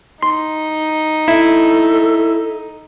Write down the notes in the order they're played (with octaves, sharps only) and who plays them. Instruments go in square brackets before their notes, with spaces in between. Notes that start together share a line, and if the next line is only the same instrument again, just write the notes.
[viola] D#4 [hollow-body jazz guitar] C6
[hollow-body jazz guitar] E4 [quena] A4